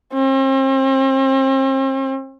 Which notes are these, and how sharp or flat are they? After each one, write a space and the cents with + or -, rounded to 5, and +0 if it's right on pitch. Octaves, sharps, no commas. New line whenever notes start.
C4 +40